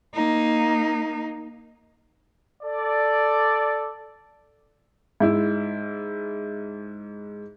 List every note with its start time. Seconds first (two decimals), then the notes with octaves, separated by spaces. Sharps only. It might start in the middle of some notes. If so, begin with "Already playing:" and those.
0.14 A#3 D#4
2.63 A4 D5
5.20 G#2 E4